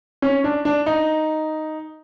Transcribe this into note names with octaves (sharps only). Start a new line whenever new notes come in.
C#4
D4
D4
D#4